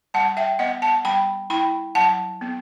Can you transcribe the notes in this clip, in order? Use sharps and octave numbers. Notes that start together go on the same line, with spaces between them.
G3 F#5 A5
E5 G5
B3 D#5 F#5
F#5 A5
G3 G5 B5
E4 G5 B5
F#3 F#5 A5
B3